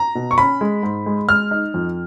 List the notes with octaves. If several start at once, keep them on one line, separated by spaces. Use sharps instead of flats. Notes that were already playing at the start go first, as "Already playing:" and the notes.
Already playing: A#5
B2
C#6
C#4 B5
G#3
G#2
G#3
G#3 F6
D#4
F2